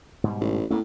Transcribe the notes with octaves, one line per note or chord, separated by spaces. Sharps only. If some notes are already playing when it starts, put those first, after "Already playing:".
G#2 B2 G3
A1
A2 A#3 B3 C#4